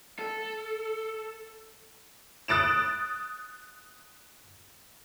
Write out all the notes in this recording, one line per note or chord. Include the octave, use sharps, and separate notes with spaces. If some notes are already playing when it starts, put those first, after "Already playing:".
A4
D#6 F#6 A6 D7 E7